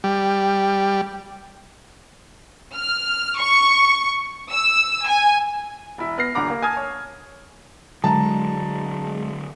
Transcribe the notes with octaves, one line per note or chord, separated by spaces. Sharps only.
G3
F6
C#6
E6
G#5
E1 E4
B3 F6 A#6 C7
D#1 D3 F#5 A#5 D6
A#3
G#5 A5 D#6 F6 G#6
C#5
D3 F#3 G#3 A5 A#5